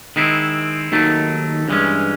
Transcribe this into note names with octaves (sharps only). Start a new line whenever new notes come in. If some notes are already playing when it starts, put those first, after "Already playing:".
D#3 G#3 C4 E4
D#2 D#3 F#3 A3
G2 E3 G#3 C#4